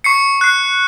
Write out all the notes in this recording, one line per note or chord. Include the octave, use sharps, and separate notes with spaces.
C#6 C7 C#7
F#6 C7